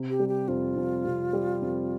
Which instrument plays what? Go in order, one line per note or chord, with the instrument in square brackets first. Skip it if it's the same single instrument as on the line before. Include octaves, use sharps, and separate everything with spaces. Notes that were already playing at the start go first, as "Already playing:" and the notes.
Already playing: [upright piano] C3
[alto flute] G4
[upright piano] G3
[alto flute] G4
[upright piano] F2 [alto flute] F4
[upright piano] F2
C3
G3
F2